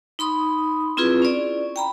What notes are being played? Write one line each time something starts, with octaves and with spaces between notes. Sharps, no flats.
D#4 B5 C6 D#6
C4 E4 F4 G#4 B4
C#4 D5
G5 A#5 B5